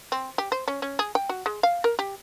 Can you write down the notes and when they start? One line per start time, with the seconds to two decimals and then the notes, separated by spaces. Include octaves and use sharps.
0.12 C4
0.38 G4
0.52 C5
0.68 C#4
0.82 C#4
0.99 G#4
1.15 G5
1.29 F#4
1.46 G#3
1.63 F5
1.84 A#4
1.99 G4